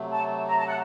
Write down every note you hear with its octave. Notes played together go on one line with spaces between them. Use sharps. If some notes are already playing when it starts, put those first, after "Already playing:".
Already playing: C3 F#3 A3
A5
A#5
A5
F#5